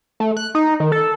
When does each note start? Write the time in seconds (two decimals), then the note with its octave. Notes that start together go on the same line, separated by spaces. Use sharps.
0.20 A3
0.37 F#6
0.55 D#4
0.80 D#3
0.92 A4